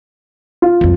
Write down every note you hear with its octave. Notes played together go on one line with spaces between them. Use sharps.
F4
C2 F2